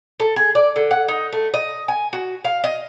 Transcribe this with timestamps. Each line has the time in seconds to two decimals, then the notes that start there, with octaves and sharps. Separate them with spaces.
0.20 A4
0.36 G#4
0.55 D5
0.76 D3
0.91 F#5
1.08 D#4
1.33 A3
1.54 D#5
1.88 G#5
2.13 F#4
2.45 F5
2.64 D#5